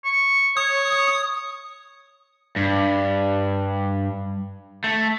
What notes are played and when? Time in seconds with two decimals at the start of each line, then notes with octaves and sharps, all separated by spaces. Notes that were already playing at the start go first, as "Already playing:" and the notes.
0.05 C#6
0.57 C#5 D#6
2.56 G2
4.84 A3